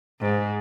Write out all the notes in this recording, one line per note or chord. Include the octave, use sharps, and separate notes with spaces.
G#2